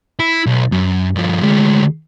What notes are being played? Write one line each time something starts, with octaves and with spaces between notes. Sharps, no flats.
E4
B1
F#2
G2 F3
D2 G#3